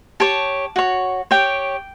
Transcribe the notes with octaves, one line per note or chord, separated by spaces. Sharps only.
G4 C#5 A5
F#4 C#5
G4 C#5 G5